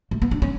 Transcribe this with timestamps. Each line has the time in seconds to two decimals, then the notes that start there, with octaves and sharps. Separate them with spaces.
0.11 A3
0.22 B3
0.31 D4
0.42 C#4